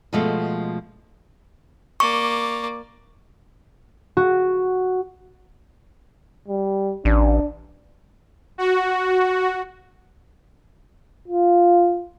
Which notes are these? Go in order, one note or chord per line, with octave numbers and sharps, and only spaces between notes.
B2 F3 G#3 A3
A#3 D5 C#6
F#4
G3
A1 D4
F#4
F4